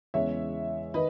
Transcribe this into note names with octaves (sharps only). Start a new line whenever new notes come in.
E2 C#3 G#3 C#5 E5
D#3 B4 D#5